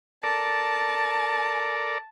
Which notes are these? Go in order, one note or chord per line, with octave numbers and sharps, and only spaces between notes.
A4 A#4 D5 A5